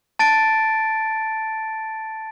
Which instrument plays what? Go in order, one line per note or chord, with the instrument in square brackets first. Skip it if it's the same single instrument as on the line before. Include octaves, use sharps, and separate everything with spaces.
[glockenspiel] A5 A6 D7